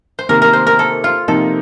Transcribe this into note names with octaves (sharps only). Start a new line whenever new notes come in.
C5
C3 D#3 A#3 A#4
A#4
C5
A#4
A4
F4
C3 F3 A#3 D#4 A4 A#4